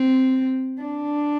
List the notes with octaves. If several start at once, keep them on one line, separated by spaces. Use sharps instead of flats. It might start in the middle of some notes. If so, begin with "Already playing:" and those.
Already playing: C4
D4